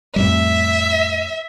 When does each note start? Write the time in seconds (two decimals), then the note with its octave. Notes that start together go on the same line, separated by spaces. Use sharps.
0.16 F2 A2 G3 E5